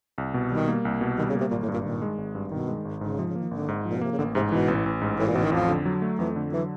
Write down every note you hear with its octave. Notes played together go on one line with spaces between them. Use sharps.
C2
B2
D#3 G3
A#3
C2
B2
D#3 G3
C#3
A#3
C3
G#1 A#2
A2
G2
A#2
A#2 D#3
G#3
G#1
G2
B2 D#3
G#3
G#1
G#2 D3
C#3
C3 F3
C#3
A#3
D#3
G#1 D3
G#2
A#2 F3
B2
C3 A#3
C#3
A1 D3
G#2 C3
B2 E3
A1
A1
G#2
A2 E3
A#2
A1 B2
D#3
F2 F3
D3
F#3
A3
F2 E3
D3
E3 F#3